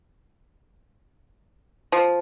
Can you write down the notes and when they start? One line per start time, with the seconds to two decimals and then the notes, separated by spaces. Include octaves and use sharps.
1.92 F3